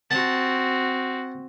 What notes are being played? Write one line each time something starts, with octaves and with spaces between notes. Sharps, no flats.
C4 F#4 F#5 A5